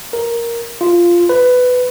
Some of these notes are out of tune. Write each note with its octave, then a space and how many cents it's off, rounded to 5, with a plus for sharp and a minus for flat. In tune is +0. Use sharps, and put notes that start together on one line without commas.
A#4 +5
F4 -10
B4 +15